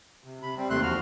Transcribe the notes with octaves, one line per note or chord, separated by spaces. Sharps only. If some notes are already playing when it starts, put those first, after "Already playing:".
C3
C3 B5
G3 C4
D#2 C3 A3 C6 F#6
E2 F3 F#4 F6